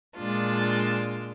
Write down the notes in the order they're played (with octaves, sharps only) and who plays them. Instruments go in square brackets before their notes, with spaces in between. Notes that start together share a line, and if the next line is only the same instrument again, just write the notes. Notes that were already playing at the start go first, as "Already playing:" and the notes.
[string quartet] A#2 G#3 D4 F4